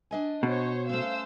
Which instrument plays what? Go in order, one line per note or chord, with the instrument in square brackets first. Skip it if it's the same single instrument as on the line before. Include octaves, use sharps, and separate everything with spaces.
[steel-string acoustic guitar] D4 D#5 G#5
[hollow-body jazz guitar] B2 [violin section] C5 C#5
[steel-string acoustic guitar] A3 C#4 [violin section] C5 F5 E6